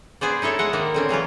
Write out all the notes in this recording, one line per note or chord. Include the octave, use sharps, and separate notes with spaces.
B3 G#4 C5 D5
D#4 E4 A4 C#5
G#3 C#5 D#5 F#5
D#3 A#3 D5
D3 C4 C#4
C#3 E3 F#3 F4